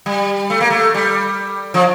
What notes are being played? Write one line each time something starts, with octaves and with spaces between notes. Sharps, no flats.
G3
A3
A#3
A3
G3
F3